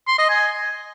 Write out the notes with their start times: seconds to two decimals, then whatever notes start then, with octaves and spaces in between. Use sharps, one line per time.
0.08 C6
0.18 D#5
0.29 G#5